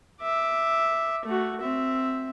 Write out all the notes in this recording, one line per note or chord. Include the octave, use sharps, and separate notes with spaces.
E5 D6
A3 F#4
C4 E5